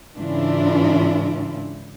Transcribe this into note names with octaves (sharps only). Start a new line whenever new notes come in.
G#2 C#3 E3 D4 E4 F4